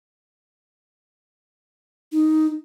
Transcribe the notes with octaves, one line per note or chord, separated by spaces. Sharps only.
D#4